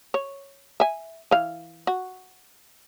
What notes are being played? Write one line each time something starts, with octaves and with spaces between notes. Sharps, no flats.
C#5
E5 G#5
E3 F5
F#4